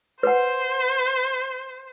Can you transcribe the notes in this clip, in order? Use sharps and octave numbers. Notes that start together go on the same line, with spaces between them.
B4 C5 F#5